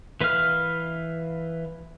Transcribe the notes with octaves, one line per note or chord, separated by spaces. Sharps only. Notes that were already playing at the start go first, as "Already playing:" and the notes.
E3 B4 E5 F5 F6